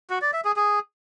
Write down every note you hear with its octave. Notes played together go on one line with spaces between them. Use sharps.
F#4
D5
E5
G#4
G#4